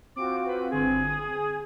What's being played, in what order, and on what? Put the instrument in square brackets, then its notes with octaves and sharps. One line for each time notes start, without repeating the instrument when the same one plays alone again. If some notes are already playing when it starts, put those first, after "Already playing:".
[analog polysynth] C4 F4 F#4 [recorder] D6
[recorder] B4
[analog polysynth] G1 D3 C4 [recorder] G#4
[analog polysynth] D#6